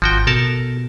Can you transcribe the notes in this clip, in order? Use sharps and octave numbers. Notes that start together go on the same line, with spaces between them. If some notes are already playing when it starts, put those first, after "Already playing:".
G#1 F3 F#4 G5
B2 A4 A#4 A5